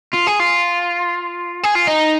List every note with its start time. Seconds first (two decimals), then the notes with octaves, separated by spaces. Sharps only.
0.13 F4
0.27 G#4
0.40 F4
1.64 G#4
1.75 F4
1.88 D#4